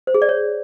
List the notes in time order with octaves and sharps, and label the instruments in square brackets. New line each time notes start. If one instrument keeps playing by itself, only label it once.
[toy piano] C5
G#4
D5
C#5